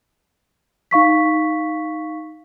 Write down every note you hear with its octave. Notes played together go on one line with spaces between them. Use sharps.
D#4 F5 C#6 B6